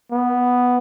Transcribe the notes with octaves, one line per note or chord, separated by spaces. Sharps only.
B3